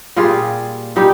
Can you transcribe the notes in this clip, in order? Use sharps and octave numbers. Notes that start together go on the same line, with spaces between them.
A#2 G3 F4 G#4
A#2 G3 D#4 G4